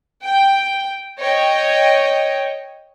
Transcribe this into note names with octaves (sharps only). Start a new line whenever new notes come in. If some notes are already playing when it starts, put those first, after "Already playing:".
G5
C#5 D#5 G5